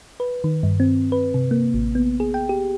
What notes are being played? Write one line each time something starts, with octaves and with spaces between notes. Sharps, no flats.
B4
D#3
G2
C4
B4
C3
A#3
A1
B3
G#4
G5
G4